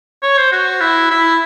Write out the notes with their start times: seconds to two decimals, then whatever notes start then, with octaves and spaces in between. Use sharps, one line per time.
0.23 C#5
0.38 C5
0.52 F#4
0.81 E4
1.11 E4